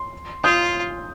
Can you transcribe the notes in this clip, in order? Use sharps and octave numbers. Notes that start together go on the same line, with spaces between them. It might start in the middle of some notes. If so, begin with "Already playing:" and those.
Already playing: C6
F4 D#6 G6